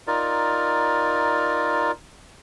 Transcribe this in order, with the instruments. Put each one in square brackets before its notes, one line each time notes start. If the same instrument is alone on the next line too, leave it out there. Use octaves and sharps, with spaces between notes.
[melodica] D#4 F4 A#4 D5